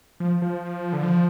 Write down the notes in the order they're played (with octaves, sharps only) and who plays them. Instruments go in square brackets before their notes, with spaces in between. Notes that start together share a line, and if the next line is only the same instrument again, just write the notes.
[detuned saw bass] F3
F3
D3
F3